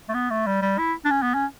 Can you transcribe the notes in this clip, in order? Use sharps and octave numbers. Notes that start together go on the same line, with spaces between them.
A3
B3
A3
G3
G3
E4
D4
C#4
B3
C#4